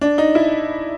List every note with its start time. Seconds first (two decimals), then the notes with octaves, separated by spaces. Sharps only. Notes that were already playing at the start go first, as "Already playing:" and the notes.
0.01 D4
0.18 D#4
0.35 E4